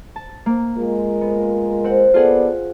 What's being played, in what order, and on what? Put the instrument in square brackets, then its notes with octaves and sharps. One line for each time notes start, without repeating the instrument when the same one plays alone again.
[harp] A5
A#3
[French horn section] G#3 F4 A#4
[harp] B3
C4 F#5
[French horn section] B3 A4 D5 [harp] F4 G#4 F#5